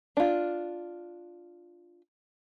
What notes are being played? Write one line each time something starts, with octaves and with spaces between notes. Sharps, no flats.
D4 F4